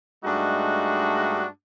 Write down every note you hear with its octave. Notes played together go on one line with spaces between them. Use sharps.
G2 G#3 A3 D4 D#4 F#4